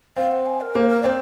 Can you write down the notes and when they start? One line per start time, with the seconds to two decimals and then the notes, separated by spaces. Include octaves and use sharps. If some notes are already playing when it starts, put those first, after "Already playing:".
0.16 C4 F5
0.32 F#5
0.46 G#5
0.61 A#4
0.75 A#3 C5
0.89 A#4
1.02 C4 C5 D5